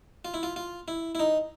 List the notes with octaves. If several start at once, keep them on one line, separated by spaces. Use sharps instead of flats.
F4
E4
F4
F4
E4
E4
D#4